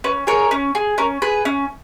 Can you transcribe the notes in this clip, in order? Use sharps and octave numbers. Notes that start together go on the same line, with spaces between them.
C#4 B4
G#4 A#4 C#5
C#4
G#4
C#4 A#4
G#4 B4
C#4